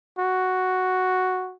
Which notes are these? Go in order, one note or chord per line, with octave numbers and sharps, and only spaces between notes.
F#4